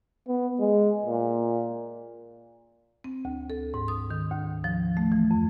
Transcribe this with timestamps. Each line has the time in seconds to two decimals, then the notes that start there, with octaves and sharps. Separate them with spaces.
0.28 B3
0.60 G#3
1.05 A#2
3.04 C4
3.25 D2
3.50 A4
3.74 G#2
3.88 D#6
4.10 D#3
4.31 D2
4.64 F3
4.97 A3
5.12 E3
5.31 F2